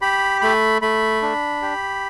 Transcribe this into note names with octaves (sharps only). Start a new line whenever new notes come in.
G4 B5
A3 B5
A3 B5
D4
G4